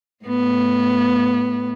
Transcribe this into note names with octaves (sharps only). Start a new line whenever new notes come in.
A2 B3